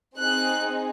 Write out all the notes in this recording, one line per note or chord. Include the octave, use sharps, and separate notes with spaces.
C4 D#4 G#4 F#6